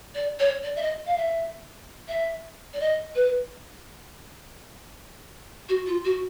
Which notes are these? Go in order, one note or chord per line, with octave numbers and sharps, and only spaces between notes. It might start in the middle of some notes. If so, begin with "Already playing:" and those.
D5
C#5
D5
E5
D#5
F5
E5
E5
D5
D#5
B4
F#4
F4
F#4